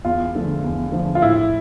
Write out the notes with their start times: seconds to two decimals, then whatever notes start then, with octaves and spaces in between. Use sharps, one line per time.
0.05 E2 F4
0.35 D3 F3 A3
0.64 E2
0.92 D3 F3 A3
1.15 F4
1.22 A2 E4